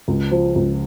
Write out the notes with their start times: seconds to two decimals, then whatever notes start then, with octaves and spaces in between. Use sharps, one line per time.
0.08 C#2
0.31 F3
0.55 C#2